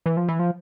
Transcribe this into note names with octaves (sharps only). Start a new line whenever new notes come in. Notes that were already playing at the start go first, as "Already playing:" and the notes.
E3
F3
E3
F3